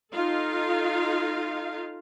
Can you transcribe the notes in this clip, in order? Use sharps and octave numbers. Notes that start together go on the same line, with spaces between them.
D#4 F4 A4 F5